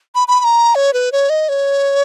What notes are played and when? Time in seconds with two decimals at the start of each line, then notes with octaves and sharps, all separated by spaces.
0.15 B5
0.28 B5
0.40 B5
0.44 A#5
0.75 C#5
0.93 B4
1.12 C#5
1.30 D#5
1.49 C#5